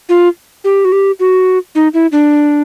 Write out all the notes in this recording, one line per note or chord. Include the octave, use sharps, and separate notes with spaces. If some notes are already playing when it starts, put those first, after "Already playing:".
F4
G4
F#4
G4
F#4
D#4
E4
D4